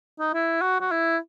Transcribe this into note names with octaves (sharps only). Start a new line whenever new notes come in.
D#4
E4
F#4
F#4
E4